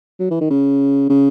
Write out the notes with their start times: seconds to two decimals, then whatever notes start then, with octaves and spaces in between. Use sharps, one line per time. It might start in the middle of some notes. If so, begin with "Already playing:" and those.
0.20 F#3
0.31 E3
0.41 D#3
0.50 C#3
1.09 C#3